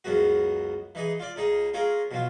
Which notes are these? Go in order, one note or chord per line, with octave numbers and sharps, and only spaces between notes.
C#2 F#2 G#3 B3 F#4
E3 D#4 G#4
F4 D5
C#2 D#4 G#4 D#6
C#4 F4 G#4 A#4
B2 F#3 F4